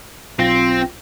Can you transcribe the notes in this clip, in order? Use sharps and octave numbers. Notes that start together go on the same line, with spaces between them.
B1 C4 F4 A#6